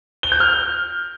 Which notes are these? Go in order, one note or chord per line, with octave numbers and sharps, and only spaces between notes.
G7
G6
F6